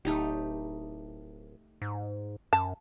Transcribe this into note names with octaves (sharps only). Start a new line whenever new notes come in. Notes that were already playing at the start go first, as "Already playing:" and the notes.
D1 A3 D#4 G4
G#2
F#2 A5